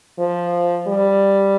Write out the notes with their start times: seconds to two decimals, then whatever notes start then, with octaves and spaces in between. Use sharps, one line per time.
0.19 F3
0.87 G3